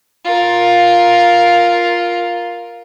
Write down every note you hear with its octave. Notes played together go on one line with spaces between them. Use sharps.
F4 A#4